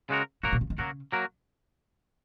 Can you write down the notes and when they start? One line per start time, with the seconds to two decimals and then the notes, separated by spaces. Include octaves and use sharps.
0.10 C#3 G#3 F#4 A#4
0.43 G#2 F#3 A#3 F#4 A#4
0.53 A#2
0.61 C#3
0.70 D#3
0.78 C#3 F#3 A#3 F#4 A#4
1.12 F#3 A#3 F#4 A#4